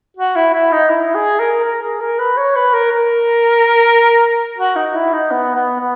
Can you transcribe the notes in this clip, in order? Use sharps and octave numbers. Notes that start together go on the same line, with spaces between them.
F#4
E4
E4
D#4
E4
G#4
A#4
A#4
G#4
A#4
B4
C#5
B4
A#4
A#4
F#4
D#4
E4
D#4
B3
B3
B3